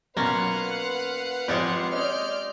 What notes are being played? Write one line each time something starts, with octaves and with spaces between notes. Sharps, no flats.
B1 A#3 C#4 F4 B4 F5 F#5
G#1 F3 G#3 F4 G4
C#4 D5 D#5 F6 G6